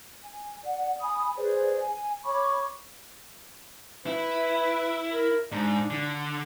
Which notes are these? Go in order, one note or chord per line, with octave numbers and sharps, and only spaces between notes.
G#5
D5 F#5
G#5 B5 D#6
G#4 B4 C5 D5
G#5
C#5 B5 C#6 D6
E4 B4
A#4
G#2 D4
D3